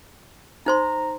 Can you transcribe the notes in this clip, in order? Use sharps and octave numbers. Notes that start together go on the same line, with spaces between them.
D#4 C5 A#5 C6